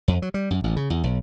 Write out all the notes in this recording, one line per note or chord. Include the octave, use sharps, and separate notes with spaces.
F2
F#3
G3
F#2
A1
C#3
E2
B1